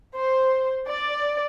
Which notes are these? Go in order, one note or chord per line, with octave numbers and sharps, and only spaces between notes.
C5
D5